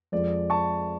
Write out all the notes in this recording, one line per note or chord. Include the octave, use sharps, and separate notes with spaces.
F2 F3 G#3 D5
A5 C#6